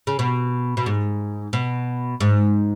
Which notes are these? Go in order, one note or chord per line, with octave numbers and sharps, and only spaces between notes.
C#3
B2
B2
G#2
B2
G#2